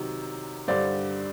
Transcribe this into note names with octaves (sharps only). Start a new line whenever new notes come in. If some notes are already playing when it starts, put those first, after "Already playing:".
Already playing: C3 D#3 F#3
G2 D3 G3 C5 D5